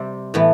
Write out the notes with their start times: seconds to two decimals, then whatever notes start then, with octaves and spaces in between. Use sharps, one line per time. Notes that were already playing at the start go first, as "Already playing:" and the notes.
Already playing: C3 G3 C4
0.34 A2 E3 B3